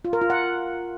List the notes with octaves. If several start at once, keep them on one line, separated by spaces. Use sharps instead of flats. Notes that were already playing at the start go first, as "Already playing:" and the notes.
F4
A#4
F4
F#5